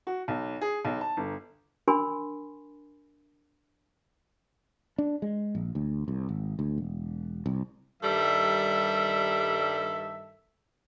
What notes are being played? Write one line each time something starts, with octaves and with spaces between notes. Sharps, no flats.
F#4
B1
G#4
B1
A5
G1
D4 A#4 G#5 B5 C6
D4
G#3
A#1
D2
C2
G#1
D2
E1
C2
G2 D#3 G3 A4 E5